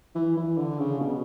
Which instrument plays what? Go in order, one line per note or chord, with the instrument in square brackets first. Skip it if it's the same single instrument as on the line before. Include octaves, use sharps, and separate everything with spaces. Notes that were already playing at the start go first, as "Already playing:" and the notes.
[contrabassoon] E3
E3
D3
C#3
B2